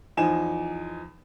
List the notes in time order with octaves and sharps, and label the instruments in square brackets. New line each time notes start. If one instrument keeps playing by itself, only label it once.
[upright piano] E2 F3 D#4 G#5 E7